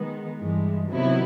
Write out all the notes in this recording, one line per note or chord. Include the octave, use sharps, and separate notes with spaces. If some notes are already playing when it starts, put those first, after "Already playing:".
Already playing: D#3 G#3 B3
G2 E3 G#3
C3 D#3 F#3 B3 E4